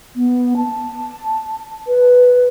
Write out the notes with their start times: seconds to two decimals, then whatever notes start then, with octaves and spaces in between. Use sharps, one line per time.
0.15 B3
0.57 A5
1.87 B4